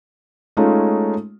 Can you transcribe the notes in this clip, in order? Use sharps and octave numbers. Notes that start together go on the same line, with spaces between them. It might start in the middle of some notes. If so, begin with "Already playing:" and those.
G#3 A3 C#4 D#4 F4